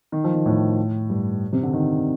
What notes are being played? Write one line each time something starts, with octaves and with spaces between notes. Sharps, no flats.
D#3
F3
D#3
A2
G2
C3
D3
D#3